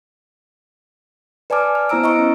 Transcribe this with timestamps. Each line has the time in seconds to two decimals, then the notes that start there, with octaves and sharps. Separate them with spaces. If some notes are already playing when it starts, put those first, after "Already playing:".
1.50 B4 D5 G#5 A5 D6 F6
1.75 F6
1.89 B3 E4 C5 A#5 E6 D7
2.04 D#5 A#5 C#6 D7
2.19 C#4 E4